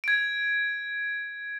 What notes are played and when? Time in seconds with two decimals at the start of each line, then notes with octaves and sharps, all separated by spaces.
0.04 G#6 D7